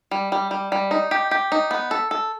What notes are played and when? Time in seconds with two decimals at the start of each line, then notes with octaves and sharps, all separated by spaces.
0.11 G3
0.32 G3
0.51 G3
0.72 G3
0.91 D#4
1.11 G4
1.31 G4
1.52 D#4
1.71 B3
1.91 A4
2.11 A4